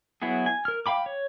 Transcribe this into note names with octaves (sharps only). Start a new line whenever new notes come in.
F#3 B3 E4 F#4 G#4
G#5
A#4 F6
F5 G5 B5 D6
C#5